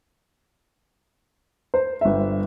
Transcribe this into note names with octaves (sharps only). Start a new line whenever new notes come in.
C5
G1 E5